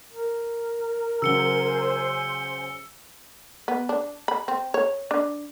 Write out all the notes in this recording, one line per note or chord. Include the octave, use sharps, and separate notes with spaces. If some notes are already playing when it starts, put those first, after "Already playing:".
A#4
C#3 F#3 C5 G#5 E6 C#7 G7
B3
D4
B5
C4
C#5
D4